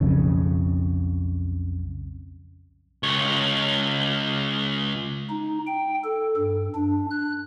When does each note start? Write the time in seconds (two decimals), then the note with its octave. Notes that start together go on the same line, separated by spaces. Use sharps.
0.01 B1 F2 C#3
3.03 C#2 C#5
5.30 D#4
5.67 G5
6.04 A4
6.37 G2
6.75 D4
7.11 F#6